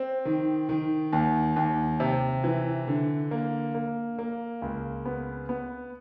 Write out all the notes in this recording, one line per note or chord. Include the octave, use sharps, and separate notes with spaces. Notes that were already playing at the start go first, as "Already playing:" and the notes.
Already playing: C4
D#3
D#3
D#2
D#2
C3
E3
D3
A#3
A#3
A#3
C#2
B3
B3